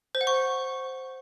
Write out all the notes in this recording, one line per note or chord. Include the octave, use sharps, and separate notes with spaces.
C5
F#5
C#6